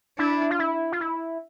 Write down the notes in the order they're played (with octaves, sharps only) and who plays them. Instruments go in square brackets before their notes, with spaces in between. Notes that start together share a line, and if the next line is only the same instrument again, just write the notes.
[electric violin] D4 [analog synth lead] E4
[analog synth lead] F4
E4
F4
E4